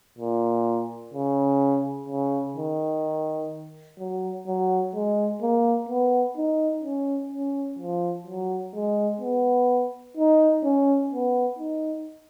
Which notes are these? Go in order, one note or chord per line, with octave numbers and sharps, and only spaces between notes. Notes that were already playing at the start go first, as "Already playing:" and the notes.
A#2
C#3
C#3
D#3
F#3
F#3
G#3
A#3
B3
D#4
C#4
C#4
F3
F#3
G#3
B3
D#4
C#4
B3
D#4